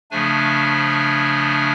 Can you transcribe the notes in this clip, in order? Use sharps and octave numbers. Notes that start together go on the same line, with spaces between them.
C#3 F3 A3 D4 G#5